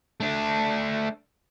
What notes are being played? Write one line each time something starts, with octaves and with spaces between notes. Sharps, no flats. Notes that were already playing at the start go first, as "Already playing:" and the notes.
A3 D4